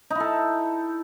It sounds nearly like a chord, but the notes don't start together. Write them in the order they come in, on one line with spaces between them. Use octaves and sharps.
D#4 E4 A4